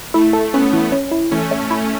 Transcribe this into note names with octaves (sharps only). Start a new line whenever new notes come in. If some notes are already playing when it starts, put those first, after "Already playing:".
A3 E4
A4
B3 C#4
E3
C#4
E4
E3 A3 C#4
A2
E4